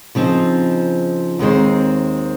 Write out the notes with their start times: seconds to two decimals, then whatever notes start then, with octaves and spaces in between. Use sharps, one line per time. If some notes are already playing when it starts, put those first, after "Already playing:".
0.15 C#3 F3 C4 D#4
1.39 D#2 D#3 G#3 C4